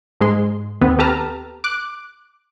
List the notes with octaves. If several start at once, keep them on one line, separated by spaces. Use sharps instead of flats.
G#2 G#3 C6
D#2 B3 C4
G4 A4 B4 A5 A#5 F6
D6 F#6